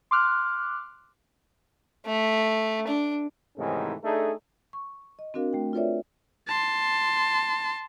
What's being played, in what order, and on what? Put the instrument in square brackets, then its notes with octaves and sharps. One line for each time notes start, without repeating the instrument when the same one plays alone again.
[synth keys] C6 D6 F6 F#6
[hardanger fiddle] A3
D4
[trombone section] G#2 C3 D#3 E3 A3 C#4
A3 D4 D#4 G#4 A4
[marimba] C#6
D#5
C4 D4 F#4 A#4 F5
A3 G5
F4 A4 B4 C#5 D5 E5
[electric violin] A5 C6